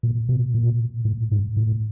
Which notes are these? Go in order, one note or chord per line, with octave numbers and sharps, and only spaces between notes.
A#2
B2
A#2
A2
G#2
A2